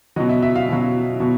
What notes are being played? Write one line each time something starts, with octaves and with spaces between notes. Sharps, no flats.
B2 F#3 D#5
E5
E5
F5
B2 F#3
B2 F#3